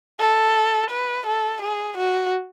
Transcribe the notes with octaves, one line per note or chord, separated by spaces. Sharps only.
A4
B4
A4
G#4
F#4